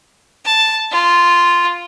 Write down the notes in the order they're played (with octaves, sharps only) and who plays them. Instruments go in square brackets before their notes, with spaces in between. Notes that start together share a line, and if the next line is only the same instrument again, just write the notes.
[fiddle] A5
F4